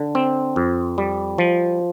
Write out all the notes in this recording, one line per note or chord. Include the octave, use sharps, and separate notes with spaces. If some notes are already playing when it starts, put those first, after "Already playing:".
Already playing: D3
C4
F2
G3
F3